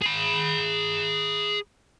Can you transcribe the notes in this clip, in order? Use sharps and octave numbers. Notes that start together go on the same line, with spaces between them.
G#4 B5